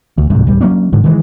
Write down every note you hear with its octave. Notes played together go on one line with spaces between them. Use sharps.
D2
D1 C2 G#2
D1 G3
F#3 A#3 C#4 D4
G#2 D3 G#3
D#3 E3 G#3